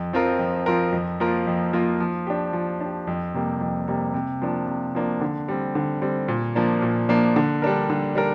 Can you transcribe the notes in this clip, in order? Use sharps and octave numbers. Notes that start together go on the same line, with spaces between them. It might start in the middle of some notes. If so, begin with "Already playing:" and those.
Already playing: F2
F3 C4 F4 A#4
F2
F3 C4 F4 A#4
F2
F3 A#3 F4 A#4
F2
F3 A#3 F4 A#4
F3
D4 G4
F3
D4 G4
F2
C3 G3 A#3
F2
C3 G3 A#3
C3
F3 A#3 D4
C3
F3 A#3 D4
D3
G3 C4
D3
G3 C4
A#2
F3 A#3 D4
A#2
F3 A#3 D4
D3
G3 D4 A#4
D3
G3 D4 A#4